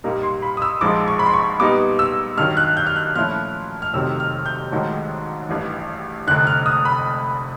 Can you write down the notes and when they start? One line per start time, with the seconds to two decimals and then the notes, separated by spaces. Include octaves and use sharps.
0.04 A#1 A#2 G3 A#3 D#4
0.23 C6
0.42 B5
0.57 D#6
0.62 E6
0.81 A#1 G#2 F3 G#3 D6
1.08 C#6
1.19 B5
1.26 C6
1.33 C#6
1.60 A#2 G3 B3 D#4 D6
1.99 E6
2.38 G2 D#3 F#3 F6
2.57 F#6
2.77 G6
2.86 F6
2.96 F#6
3.15 A#2 F3 A3 C#4 E4 F6
3.82 F6
3.93 F1 F2 C3 D#3 F#3 E6
4.20 F6
4.46 G6
4.71 A#1 G#2 D#3 F#3 A3
5.49 A1 G2 E3
6.27 F1 F2 D3 F#6
6.47 F6
6.66 D#6
6.85 B5